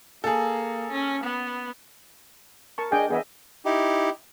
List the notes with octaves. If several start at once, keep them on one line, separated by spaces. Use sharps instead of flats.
A#3 G#4 A4
C#4
B3
A#4 A5 C#6
D4 G#4 D#5 G5 G#5
E3 B3 G#4 D#5 E5
D#4 E4 G4